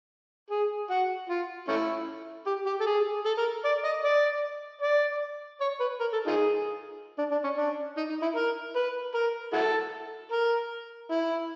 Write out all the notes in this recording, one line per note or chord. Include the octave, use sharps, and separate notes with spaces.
G#4
F#4
F4
A3 C#4 E4
G4
G4
A4
G#4
A4
A#4
D5
D#5
D5
D5
C#5
B4
A#4
A4
D#4 F4 G#4
D4
D4
C#4
D4
D#4
D#4
E4
A#4
B4
A#4
E4 F#4 A4
A#4
E4